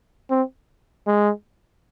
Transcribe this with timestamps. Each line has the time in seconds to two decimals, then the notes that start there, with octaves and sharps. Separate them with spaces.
0.31 C4
1.07 G#3